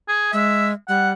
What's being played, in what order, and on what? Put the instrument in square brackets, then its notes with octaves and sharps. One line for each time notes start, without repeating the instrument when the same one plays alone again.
[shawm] G#4
[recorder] G#3 [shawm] E5
[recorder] G3 [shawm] F#5